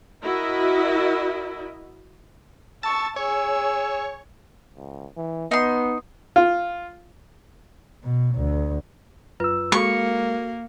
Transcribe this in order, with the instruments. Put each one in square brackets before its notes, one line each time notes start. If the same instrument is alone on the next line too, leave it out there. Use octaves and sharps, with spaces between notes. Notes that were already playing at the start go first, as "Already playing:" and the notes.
[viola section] E4 F#4 A#4 D#5 E5
[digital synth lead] A5 [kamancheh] C#6 E6
[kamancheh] G#4 E6 [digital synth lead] C#5
[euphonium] C#2
E3
[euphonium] B3 [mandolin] D#4 C6
[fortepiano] F4
[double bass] B2
D2
[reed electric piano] F#2 E6 [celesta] F4 B4
[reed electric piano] G#3 [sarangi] A#3 [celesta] F#4 A4 [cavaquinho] C#6